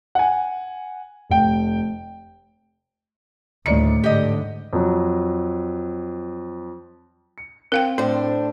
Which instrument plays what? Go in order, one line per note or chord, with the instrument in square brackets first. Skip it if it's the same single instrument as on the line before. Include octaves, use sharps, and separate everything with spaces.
[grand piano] F#5 G#5
F1 G5
[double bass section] D2 [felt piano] A2 D5 C#7 [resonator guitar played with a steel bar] D#3
[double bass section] G#2 D3 [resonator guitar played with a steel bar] G4 D#5
[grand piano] F2 F#3
C#7
[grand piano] C4 [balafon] A#4 F5 G5
[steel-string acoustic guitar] A2 D4 [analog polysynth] C5